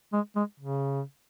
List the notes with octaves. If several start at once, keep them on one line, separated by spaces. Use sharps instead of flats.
G#3
G#3
C#3